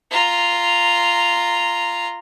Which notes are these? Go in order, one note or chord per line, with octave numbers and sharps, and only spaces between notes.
F4 A#5